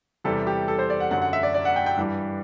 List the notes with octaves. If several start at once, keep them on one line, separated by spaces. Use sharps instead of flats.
E2 C3 E3 G3 A4
G4
A4
C5
D5
F#5
F#2 D3 F#3 F#5
F#5
E5
D5
D5
F#5
G5
G5
G2 E3 G3